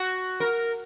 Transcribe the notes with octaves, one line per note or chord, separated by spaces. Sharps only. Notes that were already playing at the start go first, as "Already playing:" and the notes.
Already playing: F#4
A#4